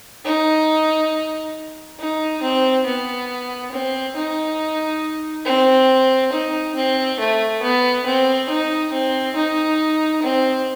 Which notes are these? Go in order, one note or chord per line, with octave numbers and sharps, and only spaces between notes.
D#4
D#4
C4
B3
C4
D#4
C4
D#4
C4
A3
B3
C4
D#4
C4
D#4
C4